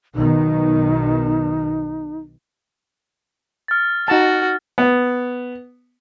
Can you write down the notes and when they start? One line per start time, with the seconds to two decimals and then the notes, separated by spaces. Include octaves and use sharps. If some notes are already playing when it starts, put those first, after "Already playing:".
0.15 B1 B2 D#3 D#4
3.68 F6 A6
4.08 D#4 F#4 A5
4.78 B3